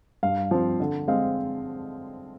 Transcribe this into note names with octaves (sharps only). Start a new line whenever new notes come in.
G2 F5
F3 C4
D3
G#3 C4 F5